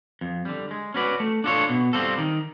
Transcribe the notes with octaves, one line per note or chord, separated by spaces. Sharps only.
F2
D3 G3
G#3
C#4 F#4 B4 D5
A3
D4 F4 A4 C#5
B2
G3 C4 F4 A4
D#3